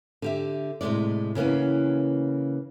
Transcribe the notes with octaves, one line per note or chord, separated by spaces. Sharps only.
D3 G4 E5
A2 C3 D#3 G#3 D5
C#3 E3 A#3 B3 C#4